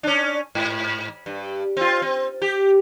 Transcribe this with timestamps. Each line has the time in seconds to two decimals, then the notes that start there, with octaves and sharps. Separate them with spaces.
0.03 C#4 D4
0.55 G#2
1.26 G2
1.77 C4 F4
2.02 C4
2.42 G4